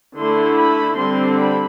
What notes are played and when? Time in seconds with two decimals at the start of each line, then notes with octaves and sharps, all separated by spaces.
0.16 D3 A3 E4 C6
0.56 B5
0.96 D3 G3 C4 C6
1.37 B5